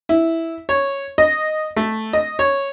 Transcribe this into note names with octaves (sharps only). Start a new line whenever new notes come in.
E4
C#5
D#5
A3
D#5
C#5